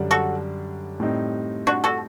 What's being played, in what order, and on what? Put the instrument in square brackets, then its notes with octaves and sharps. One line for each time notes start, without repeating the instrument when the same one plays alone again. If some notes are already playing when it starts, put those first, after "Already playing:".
Already playing: [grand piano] F#2 D3 G3 D4
[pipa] F#4 A4
[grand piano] A2 G3 C4 D#4
[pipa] D4 F#4
F#4 A4